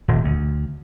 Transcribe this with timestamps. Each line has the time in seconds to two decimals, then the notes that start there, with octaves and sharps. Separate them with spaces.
0.08 D#1
0.24 D2